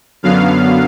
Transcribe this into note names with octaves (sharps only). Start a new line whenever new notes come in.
F#2 D3 F#3 B3 F5